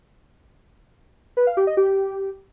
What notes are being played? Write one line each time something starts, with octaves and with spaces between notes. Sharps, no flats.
B4
F5
G4
D#5
G4